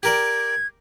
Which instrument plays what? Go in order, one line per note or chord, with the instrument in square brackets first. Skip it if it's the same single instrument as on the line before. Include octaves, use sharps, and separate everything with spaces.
[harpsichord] G4 A#4 D5 [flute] G#6